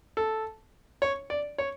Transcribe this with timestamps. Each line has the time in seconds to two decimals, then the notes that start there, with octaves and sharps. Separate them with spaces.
0.17 A4
1.02 C#5
1.30 D5
1.58 C#5